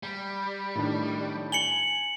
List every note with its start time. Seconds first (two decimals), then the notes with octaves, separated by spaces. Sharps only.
0.03 G3
0.75 A2 D#3 D4
1.52 G#5 C#7 F#7 G7